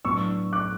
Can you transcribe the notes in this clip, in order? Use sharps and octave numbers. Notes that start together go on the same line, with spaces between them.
A2 F#3 B3 D4 C#6 E6
D6 F#6